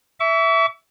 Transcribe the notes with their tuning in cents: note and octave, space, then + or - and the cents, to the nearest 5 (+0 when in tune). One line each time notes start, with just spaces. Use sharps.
E5 +0 C#6 +45